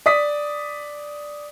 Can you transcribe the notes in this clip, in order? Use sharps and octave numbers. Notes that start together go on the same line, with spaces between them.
D5 D#6 B6